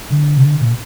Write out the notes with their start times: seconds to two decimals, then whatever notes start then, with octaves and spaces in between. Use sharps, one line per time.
0.10 D3
0.37 C3
0.43 D3
0.61 A#2